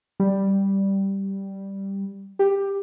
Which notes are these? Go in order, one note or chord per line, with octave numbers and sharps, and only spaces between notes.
G3
G4